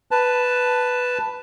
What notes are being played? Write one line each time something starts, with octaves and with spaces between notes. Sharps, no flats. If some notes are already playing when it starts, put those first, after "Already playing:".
B4 A5